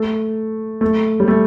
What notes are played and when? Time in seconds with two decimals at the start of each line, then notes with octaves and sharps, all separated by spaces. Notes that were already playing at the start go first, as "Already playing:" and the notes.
Already playing: A3
0.81 A3
1.20 G3
1.28 A3